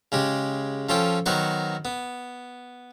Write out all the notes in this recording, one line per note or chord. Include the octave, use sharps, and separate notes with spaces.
C#3 G#3 G4
F3 C#4 F4 A4 G5
D#3 F#3 B3 F#4 C5 C#6
B3